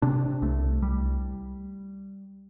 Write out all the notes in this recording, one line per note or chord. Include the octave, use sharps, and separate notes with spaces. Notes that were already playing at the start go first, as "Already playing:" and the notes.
C3 D4
C2 A3
C2 G3